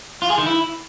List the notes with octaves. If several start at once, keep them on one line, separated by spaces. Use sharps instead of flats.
F4
G#4
D#3
E4